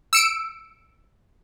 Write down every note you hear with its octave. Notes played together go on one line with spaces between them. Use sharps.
E6 C#7 D7